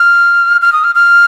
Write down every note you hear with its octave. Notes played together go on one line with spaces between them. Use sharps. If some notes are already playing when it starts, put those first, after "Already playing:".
Already playing: F6
F6
D#6
F6
F6